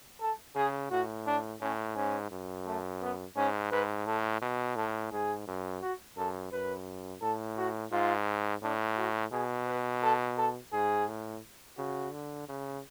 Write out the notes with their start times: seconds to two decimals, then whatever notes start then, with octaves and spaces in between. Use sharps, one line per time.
0.21 A4
0.56 C#3 G#4
0.91 A2 F#4
1.27 D4
1.61 A2 C#4
1.96 G#2 C#4
2.31 F#2
2.67 A3
3.01 B3
3.36 G#2 C#4
3.72 G#2 B4
4.06 A2 A4
4.41 B2
4.76 A2 A4
5.12 G#2 G#4
5.47 F#2
5.82 F#4
6.17 F#2 A4
6.53 F#2 B4
7.22 A2 A4
7.58 F#4
7.92 G#2 F4
8.62 A2 D4
8.97 F#4
9.32 B2 G#4
9.68 B4
10.03 A4
10.38 A4
10.73 G#2 G#4
11.08 A2
11.78 C#3 F#4
12.13 D3
12.49 C#3